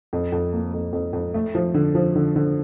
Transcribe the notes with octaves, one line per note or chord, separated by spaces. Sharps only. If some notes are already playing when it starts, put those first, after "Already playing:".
F2
F2
A#3
F2
F2
F2
A3
F3
D3
F3
D3
D3